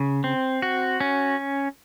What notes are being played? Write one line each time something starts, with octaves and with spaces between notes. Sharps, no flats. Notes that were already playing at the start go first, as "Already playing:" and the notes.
Already playing: C#3
C4
F#4
C#4